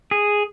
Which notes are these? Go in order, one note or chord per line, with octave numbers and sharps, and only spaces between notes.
G#4